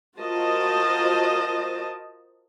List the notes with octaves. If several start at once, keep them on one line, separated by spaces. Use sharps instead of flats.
F4 F#4 A#4 C5 D#5 A5